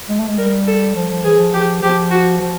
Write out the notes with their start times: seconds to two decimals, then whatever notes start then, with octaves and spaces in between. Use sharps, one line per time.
0.09 G#3
0.19 A3
0.28 G#3
0.38 G3 A#4
0.67 A4
0.96 F3
1.10 F3
1.24 E3 G#4
1.39 F3
1.54 G4
1.83 F3 G4
2.11 F#4
2.40 F3